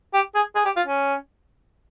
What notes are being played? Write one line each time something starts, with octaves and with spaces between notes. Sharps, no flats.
G4
G#4
G#4
G4
F4
C#4